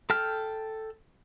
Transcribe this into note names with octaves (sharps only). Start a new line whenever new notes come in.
A4 G5 F6